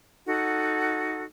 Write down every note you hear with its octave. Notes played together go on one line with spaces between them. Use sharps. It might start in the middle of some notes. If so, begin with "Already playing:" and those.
D#4 F#4 A4 F#5